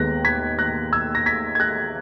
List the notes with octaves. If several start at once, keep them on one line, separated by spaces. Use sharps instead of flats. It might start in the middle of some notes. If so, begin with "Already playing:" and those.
Already playing: D#2 D#3 G#3 B3 F#6 A#6
G#6 B6
F#6 A#6
E6 G#6
A#6
G#6 B6
G#6
F#6 A#6